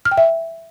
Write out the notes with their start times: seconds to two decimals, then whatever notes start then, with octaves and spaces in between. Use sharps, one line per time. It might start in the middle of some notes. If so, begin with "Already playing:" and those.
0.05 F6
0.11 G5
0.18 E5